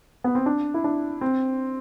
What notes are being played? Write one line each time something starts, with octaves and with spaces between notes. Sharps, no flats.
B3
C4
D4
E4
D4
C4